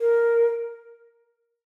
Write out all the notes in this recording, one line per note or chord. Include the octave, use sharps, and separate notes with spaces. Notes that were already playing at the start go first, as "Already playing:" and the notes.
A#4